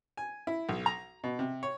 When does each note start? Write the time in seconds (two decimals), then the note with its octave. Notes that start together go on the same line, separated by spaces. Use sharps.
0.17 G#5
0.47 E4
0.69 B1
0.86 A#5
1.24 B2
1.39 C3
1.63 C#5